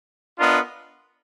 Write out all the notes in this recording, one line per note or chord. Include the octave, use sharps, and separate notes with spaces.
B3 D4 F4 A#4 D#5